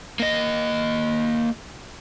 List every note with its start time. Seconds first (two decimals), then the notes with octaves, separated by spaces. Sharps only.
0.20 A#3 D#5